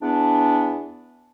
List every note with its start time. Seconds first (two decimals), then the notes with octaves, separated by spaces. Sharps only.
0.02 E2 E3 B3 D4